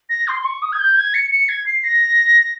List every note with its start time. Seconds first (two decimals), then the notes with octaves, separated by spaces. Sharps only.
0.09 A#6
0.28 C6
0.41 C6
0.45 C#6
0.62 D#6
0.72 G#6
0.79 G6
0.96 G#6
1.14 C#7
1.31 C#7
1.49 G#6
1.66 C7
1.84 A#6